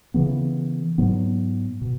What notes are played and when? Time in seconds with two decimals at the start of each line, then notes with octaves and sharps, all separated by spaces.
0.14 C#3 E3 B3
0.98 G#2 F#3 B3
1.81 B2